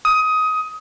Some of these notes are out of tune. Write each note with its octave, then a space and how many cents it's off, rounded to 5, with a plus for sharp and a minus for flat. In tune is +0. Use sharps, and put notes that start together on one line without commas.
D#6 +20